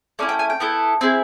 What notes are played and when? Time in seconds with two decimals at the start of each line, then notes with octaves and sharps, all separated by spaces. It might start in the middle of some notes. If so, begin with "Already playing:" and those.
0.19 A3 C#4 E4 D5
0.29 G5
0.39 G#5
0.50 G5
0.60 B3 E4 A4
1.01 C4 E4 G#4